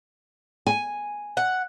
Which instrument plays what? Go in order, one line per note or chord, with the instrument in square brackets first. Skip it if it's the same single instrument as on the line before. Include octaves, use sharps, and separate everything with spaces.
[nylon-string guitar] G#5
[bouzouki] F#5